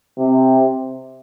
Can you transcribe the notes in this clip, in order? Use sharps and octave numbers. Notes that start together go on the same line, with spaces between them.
C3